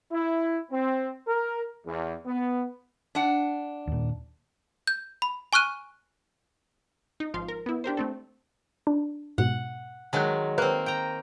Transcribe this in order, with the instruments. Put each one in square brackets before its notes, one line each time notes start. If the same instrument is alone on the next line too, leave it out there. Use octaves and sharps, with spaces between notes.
[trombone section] E4
C4
A#4
E2
B3
[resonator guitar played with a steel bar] D4 F#5
[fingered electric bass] D#2 A#2
[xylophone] G6
B5
G#5 C#6 F6 F#6 D#7
[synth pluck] D#4
G#1 F3 F5 C6
A#4
B3 E4
D4 G4 A#4 C5
A3 C4 A4
D4
[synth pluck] G#2 B2 [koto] F#5
[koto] D#3 F#3 G#3 [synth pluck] A5 F#6
[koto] A#3 C4 [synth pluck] B4 F#6
[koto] G5 A#5